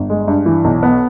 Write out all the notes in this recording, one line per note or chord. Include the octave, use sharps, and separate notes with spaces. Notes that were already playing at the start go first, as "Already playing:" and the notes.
Already playing: G1
G#3
G2
E3
B1
B3